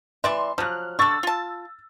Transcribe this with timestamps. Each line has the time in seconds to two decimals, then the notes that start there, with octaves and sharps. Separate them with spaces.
0.24 E3 D5 E5 C6
0.58 F3 F#3 F6 F#6
0.99 D3 C#6 E6 A6
1.23 F4 A5